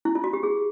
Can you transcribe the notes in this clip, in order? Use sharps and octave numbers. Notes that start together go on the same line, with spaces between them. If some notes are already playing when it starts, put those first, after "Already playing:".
E4
F4
F#4
G4
G#4